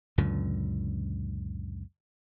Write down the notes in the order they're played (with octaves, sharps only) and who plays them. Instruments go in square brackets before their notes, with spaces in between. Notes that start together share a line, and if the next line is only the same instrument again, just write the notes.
[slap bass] C#2 F#2 A#2 D3